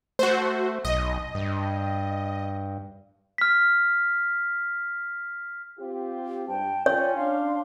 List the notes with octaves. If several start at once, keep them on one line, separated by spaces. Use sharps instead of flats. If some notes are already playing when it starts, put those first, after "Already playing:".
A3 F#4 C5
B1 D#5
G2
F6 B6
C4 F4 G4
G2 G5 A5
C#4 F4 C#5 D5 G5
D4 F5 C6